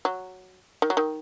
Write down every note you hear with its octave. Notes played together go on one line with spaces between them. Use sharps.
F#3
D#3
F#3
D#3